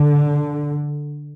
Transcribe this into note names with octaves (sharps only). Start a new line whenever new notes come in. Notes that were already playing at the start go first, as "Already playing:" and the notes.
Already playing: D3